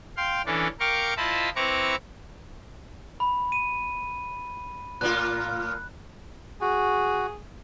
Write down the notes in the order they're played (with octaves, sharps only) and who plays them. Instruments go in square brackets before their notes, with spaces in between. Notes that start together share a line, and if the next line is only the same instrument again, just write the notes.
[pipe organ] F5 G5 C6
E3 C#4 D4 A4
A#4 F5 G5 C#6 D6
E4 F4 C5 D#5 A5 B5
C4 E4 B4 A#5 C#6 D6
[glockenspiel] B5
D#7
[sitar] A2 A#3 F4 [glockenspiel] F#6
[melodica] F#4 [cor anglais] G#4